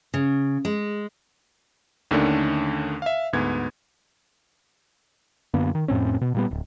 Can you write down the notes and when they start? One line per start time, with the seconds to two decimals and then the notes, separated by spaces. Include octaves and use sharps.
0.14 C#3
0.65 G#3
2.11 D#2 D3 D#3 A3 C#4 D4
3.02 E5 F5
3.33 D2 G#2 B3 G#6
5.54 F#2 D3 A#3 B3
5.75 D#3
5.88 F2 A2 C4 C#4
6.21 B2
6.35 A#2 G3 B3
6.51 D1